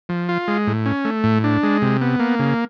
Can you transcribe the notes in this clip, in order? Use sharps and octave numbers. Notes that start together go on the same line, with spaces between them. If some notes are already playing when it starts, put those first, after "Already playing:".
F3
F4
G#3
A2
C#4
A3
A2
D4
G#3
C3
B3
A#3
C#3